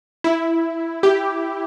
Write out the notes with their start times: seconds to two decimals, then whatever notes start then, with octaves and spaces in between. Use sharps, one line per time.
0.24 E4
1.03 G4